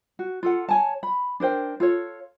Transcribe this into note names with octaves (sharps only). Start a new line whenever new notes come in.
F#4
F4 A4 F#5
C#5 G#5 A5
B5
D4 A#4 C5 G5
F4 A4 C#5